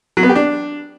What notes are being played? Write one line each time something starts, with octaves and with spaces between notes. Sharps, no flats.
F#3
B3
G4
D4